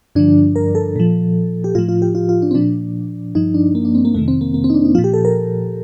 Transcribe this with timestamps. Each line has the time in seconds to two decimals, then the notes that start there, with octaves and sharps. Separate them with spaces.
0.15 G2 D3 F3 D4
0.56 A#4
0.75 A4
0.96 A#2 F3
1.64 G4
1.75 A2 F3 F4
1.89 F4
2.02 G4
2.15 F4
2.29 F4
2.42 D4
2.51 C4
2.55 A#2 F3 D4
3.35 G2 F3 D#4
3.54 D4
3.75 A#3
3.85 D4
3.95 C4
4.05 A#3
4.14 F2 C3 D#3 A3
4.28 C4
4.41 A#3
4.54 A#3
4.64 C4
4.70 D#4
4.74 D4
4.84 D#4
4.95 A#2 F3 F4
5.04 G4
5.14 A4
5.25 A#4